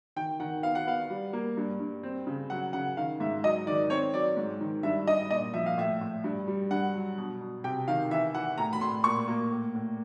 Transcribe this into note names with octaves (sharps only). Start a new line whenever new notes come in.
D#3 G5
D#3 F#5
B3 F5
F#5
B3 F5
G3
A#3
G2
G2
C4
C#3
F#3 F#5
C#3 F#5
D#3 F5
G#2 E5
F#3 D#5
D#3 D5
C4 C#5
F#3 D5
G#2
D#3
G2 E5
G2 D#5
A#2 D#5
F3 E5
F5
A2 E5
A2
G2
G3
G2 F#5
F#3
B2
B2
C3 G5
D#3 F5
E3 E5
E3 F#5
A2 A#5
B5
A2 C6
A#2 C#6
A#3
A2
A2